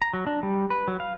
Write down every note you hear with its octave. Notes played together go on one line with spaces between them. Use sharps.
A#5
F#3
D4
G3
B4
F#3
F5